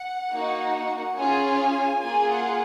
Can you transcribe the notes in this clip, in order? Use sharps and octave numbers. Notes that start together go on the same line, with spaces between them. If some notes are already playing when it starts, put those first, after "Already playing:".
Already playing: F#5
A#3 D#4 F#4
C#4 F4 G#4 G#5
A#3 F4 G#4 G#5
F#5